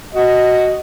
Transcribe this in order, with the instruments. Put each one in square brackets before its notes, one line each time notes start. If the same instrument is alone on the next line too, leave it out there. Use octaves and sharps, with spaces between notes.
[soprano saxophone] F#4 [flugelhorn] D#5